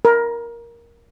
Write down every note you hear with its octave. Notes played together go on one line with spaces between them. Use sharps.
A#4